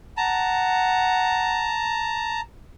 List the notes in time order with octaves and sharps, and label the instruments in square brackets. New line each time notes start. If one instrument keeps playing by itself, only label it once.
[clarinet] F#5 [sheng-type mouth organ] A5 A#5